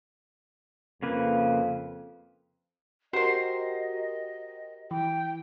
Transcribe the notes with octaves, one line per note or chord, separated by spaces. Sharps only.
F2 C#3 A#3 B4
F#4 G4 A#4 C5 D#5 C6
E3 G5